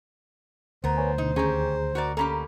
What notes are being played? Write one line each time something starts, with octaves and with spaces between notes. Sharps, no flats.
D2 B3 A#4 C5
B4 C#5 G#5
B2 D3 D#4
D#2 C#4 G4 G#4 A#5
F#4 A#4 D5
A#3 C#4 G4 A4 A#5 B5